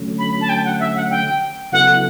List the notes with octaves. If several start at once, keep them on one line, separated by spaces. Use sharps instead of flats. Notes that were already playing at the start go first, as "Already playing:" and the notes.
Already playing: D3 F#3 A3 C#4
B5
A5
G5
F#5
E5
F#5
G5
C#3 F#3 B3 E4 A4 F#5